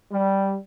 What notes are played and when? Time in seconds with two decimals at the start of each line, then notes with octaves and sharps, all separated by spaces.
0.12 G3